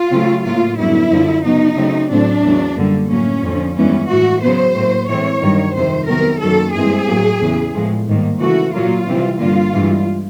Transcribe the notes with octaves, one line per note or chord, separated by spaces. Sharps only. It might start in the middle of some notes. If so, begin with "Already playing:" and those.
Already playing: F4
C#3 F#3 A3 C4
A2 F#3 A#3 F4
F#2 D3 G3 B3 E4
F#2 D3 F3
C#3 F#3 B3 D#4
C#3 F#3 A3 C4
A2 F#3 A3 C4 D4
E2 C#3 F#3
F#2 D3 G3 A#3
A2 F#3 A#3 C#4
F2 D3 F3
G2 E3 G#3 B3 C#4
A2 E3 G#3 F#4
C#3 F#3 B3 C5
A2 F#3 A#3
A2 E3 G#3 C4 C#5
G2 D#3 F#3
F2 C3 D#3 C5
C3 D#3 F#3 B3 A#4
F#2 D#3 F#3 A#3 A4
G2 E3 G#3 C4 G#4
A2 F#3 A#3
E2 C#3 E3
A2 F3 G#3 B3
G#2 D#3 G3 A#3
C#3 E3 A3 F#4
A#2 F#3 A#3 F4
C3 E3 G3 C4
G2 D3 G3 A#3 F4
G2 E3 G#3